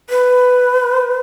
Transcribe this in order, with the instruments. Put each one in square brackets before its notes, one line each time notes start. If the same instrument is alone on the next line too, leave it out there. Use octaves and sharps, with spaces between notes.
[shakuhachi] B4